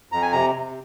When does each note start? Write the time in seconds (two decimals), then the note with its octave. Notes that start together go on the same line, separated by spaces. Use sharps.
0.12 F2 A#5
0.22 G#5
0.32 C3 A#5
0.55 C3